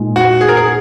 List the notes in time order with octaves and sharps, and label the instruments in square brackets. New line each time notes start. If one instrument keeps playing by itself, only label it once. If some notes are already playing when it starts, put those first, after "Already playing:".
Already playing: [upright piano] A#2 G#3 D#4
[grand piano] F#4
G#4
A#4
G#4